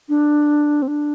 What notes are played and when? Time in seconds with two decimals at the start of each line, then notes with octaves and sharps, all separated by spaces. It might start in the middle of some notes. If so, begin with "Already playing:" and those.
0.09 D4
0.82 C4
0.88 D4